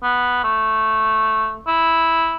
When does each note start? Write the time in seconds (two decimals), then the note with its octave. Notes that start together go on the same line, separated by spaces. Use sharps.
0.03 B3
0.44 A3
1.67 E4